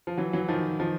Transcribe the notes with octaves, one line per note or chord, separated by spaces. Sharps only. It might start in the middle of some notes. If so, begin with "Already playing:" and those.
F3
E3 F#3
E3 F#3
D#3 F3
D#3 F3